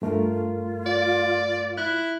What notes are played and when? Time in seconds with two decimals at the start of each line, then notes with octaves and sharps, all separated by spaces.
0.02 G2 A3 F4 A#4
0.86 D5
1.78 E4 F#6